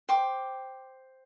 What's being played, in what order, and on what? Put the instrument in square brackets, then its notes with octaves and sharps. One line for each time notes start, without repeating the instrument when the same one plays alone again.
[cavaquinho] C5 G5 D6